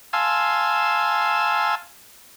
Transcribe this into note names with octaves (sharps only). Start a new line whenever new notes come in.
F5 G#5 A5 C6 E6